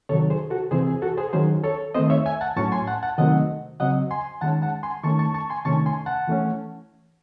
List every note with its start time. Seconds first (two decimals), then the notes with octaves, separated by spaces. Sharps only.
0.09 C3 D#3 F#3 A4 C#5
0.30 G#4 C5
0.50 F#4 A4
0.71 C3 E3 C4 G#4 C5
0.87 G#4
1.02 F#4 A4
1.17 G#4 C5
1.33 D#3 F#3 C#4 G#4 C5
1.64 A4 C#5
1.94 D#3 A3 C4 C5 D#5
2.10 C#5 E5
2.26 E5 G#5
2.41 F#5 A5
2.56 A2 F#3 C#4 A5 C#6
2.72 G#5 C6
2.87 F#5 A5
3.03 F#5 A5
3.18 C3 D#3 F#3 A3 C4 D#5 F#5
3.80 C#3 F#3 C4 D#5 F#5
4.11 G#5 C6
4.41 D#3 G#3 C#4 F#5 A5
4.62 F#5 A5
4.83 G#5 C6
5.03 D#3 A3 C#4 A5 C#6
5.19 A5 C#6
5.34 A5 C#6
5.50 G#5 C6
5.65 C3 D#3 A3 C#4 A5 C#6
5.86 G#5 C6
6.06 F#5 A5
6.27 E3 A3 C#4